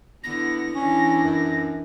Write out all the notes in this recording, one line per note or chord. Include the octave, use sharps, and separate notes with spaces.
D3 B3 E4 A#6
E3 C#4 D4 E4
F#2